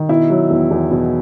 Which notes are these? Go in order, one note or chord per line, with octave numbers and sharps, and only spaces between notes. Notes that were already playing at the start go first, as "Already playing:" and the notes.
Already playing: D#3
B2 E4
F#3
E2
E2
B2